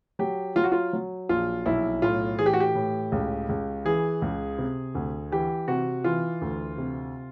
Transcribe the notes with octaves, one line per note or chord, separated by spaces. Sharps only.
F#3 G4
F#3 F4
F#4
F4
F#3
A#1 F4
B1 E4
A2 F4
E3 G#4
G4
F#4
G4
A2
C#2
C#2
E3 G#4
C#2
C3
D2
E3 G4
C3 F#4
E3 F4
D2
C3